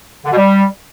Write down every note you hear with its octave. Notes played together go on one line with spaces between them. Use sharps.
D3
B2
G3